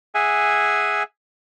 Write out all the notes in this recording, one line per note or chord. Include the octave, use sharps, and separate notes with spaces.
G#4 E5 F#5 G#5